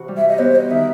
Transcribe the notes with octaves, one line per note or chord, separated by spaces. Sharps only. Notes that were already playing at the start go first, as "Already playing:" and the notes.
Already playing: C3 E3 F#4
G3
E5
D#5
B3 C5
D#5
D#3 E5